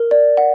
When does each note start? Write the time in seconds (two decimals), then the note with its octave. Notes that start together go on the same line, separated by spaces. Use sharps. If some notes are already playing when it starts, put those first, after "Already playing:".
Already playing: A#4
0.11 D5
0.37 F#5